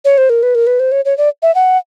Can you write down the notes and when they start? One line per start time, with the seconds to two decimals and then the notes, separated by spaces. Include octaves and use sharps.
0.05 C#5
0.18 C5
0.30 A#4
0.43 B4
0.55 A#4
0.67 B4
0.80 C5
0.92 C#5
1.05 C#5
1.18 D5
1.42 E5
1.55 F#5